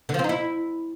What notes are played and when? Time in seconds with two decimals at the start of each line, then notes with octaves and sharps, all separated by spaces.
0.09 D3
0.14 F3
0.19 C4
0.24 D#4
0.29 E4